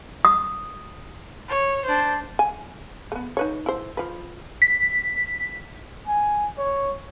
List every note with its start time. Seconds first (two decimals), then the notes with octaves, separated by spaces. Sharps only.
0.25 D#6
1.49 C#5
1.85 D4 C5
2.39 G#5
3.12 A3 B3
3.37 D#4 B4 C#5
3.66 E4 C5
3.97 F3 B4
4.62 B6
6.07 G#5
6.58 C#5